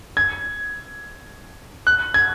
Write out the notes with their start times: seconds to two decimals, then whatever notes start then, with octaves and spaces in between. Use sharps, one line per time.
0.17 G#6
1.87 F#6
2.14 G#6